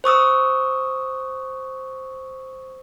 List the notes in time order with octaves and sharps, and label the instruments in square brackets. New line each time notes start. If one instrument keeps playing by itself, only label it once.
[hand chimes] C5 C#6 D#6 E6